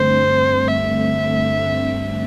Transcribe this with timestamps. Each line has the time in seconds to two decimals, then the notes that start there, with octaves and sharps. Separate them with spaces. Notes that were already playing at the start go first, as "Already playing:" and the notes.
Already playing: G2 D3 A3 C4 C5
0.67 E5